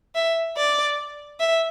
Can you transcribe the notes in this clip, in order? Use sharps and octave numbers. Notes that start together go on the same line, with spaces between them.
E5
D5
E5